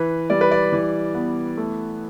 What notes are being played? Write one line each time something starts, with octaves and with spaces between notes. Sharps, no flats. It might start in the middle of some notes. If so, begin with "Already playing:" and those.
Already playing: E3 B4
G3 D5
B4
D5
E3
B3
A3